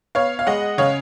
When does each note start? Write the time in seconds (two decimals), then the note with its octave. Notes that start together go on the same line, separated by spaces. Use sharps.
0.15 B3 C#5 F5
0.39 F5
0.47 G#3 D#5 F#5
0.78 C#3 C#5 F5